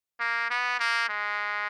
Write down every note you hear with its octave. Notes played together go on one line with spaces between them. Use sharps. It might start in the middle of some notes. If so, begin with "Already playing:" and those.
A#3
B3
A#3
G#3